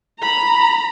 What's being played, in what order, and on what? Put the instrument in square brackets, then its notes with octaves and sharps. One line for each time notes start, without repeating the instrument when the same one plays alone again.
[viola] A#5 B5